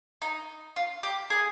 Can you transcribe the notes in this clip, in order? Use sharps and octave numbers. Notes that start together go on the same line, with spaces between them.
D#4
F4
G4
G#4